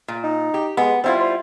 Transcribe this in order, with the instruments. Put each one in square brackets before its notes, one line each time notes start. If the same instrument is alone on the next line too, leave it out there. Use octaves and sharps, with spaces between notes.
[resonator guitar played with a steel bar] A#2
[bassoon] D#4
[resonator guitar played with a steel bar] G4
[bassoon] G#3 [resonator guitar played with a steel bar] B3
[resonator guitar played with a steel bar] G3 E4 F4 [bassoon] C4
[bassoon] C5